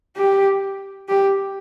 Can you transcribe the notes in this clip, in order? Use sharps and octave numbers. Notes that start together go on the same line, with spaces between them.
G4
G4